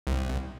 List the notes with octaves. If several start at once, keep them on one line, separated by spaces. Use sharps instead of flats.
C2